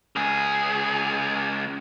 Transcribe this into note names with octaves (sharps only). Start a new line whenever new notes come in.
C#2 G#4